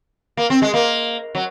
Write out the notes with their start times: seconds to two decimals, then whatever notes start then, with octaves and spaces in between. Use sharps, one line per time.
0.37 A#3
0.50 C4
0.62 G#3
0.74 A#3
1.35 F#3